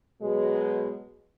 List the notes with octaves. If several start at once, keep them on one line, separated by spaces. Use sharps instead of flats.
B2 F#3 G#3